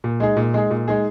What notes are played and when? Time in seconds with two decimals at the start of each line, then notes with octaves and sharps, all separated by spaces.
0.04 A#2
0.20 G#3 D#4 G#4
0.37 A#2
0.54 G#3 D#4 G#4
0.71 A#2
0.88 G#3 D#4 G#4